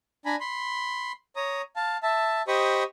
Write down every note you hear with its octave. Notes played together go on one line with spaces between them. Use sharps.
D4 G#5 A#5 B5
B5 C6
C#5 A#5 D#6
F5 A5
E5 A5
G4 C5 D#5 B5 C#6 D#6